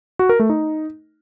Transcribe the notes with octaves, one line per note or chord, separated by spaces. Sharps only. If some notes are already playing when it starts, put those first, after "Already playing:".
F#4
A#4
A3
D#4